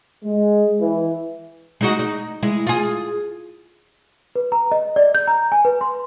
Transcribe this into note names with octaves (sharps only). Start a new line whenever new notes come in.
G#3
E3
G#3 D#4 F#4
D#4
G#3 E4
F4 G#4
B4
A#5
D#5
D5
G6
A#5
G#5
B4
C6